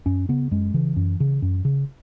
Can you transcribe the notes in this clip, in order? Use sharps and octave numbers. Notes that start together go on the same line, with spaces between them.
F#2 C#4
C#3 B3
F#2 G#3
C#3 E3
F#2
C#3
F#2
C#3